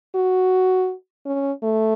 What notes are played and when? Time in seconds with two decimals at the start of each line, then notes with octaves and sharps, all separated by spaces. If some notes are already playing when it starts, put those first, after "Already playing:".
0.15 F#4
1.26 C#4
1.63 A3